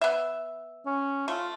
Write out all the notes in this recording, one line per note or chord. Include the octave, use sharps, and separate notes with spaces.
B3 E5
C#4
A3 F4